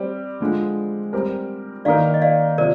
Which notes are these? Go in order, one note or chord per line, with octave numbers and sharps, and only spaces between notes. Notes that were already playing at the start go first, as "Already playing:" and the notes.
Already playing: G3 C4 G4 D5
D3 F3 G#3
G3 C4 G4 A#4
D#3 A#3 D#4 A#4 D5 F5
D#5
D5 F5
C3 F3 A#4 D5